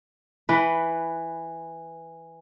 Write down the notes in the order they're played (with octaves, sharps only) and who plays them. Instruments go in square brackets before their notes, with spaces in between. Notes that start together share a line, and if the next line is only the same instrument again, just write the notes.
[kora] E3 B4